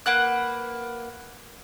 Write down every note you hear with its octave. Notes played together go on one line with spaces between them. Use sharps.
A#3 B4 F#5 F#6